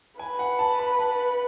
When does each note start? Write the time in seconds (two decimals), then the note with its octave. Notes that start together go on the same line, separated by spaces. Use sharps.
0.19 B4 G#5
0.39 F#5
0.59 A5
0.79 B5
0.98 A5